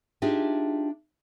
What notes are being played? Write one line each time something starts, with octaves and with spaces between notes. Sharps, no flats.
D4 D#4 F4 G4 G#4 E5